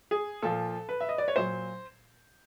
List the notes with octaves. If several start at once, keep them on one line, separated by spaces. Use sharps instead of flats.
G#4
A#2 F3 A4
B4
E5
D#5
D5
C#5
A#2 F#3 C5